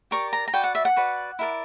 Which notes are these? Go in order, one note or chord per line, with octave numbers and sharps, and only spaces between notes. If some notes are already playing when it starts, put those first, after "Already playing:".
G4 A#4 D5 C#6
A#5
A#5
F#4 B4 D5 G5
F#5
E5
F#5
F#4 B4 D5
E4 A#4 D5